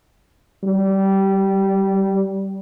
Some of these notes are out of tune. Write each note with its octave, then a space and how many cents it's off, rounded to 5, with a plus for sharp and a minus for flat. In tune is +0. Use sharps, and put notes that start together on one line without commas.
G3 -15